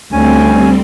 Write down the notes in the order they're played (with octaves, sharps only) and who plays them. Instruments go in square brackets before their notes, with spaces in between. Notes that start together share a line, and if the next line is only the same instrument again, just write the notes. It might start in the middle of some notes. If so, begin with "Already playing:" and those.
[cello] D2 [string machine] G3 C4 [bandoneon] C#4 G#5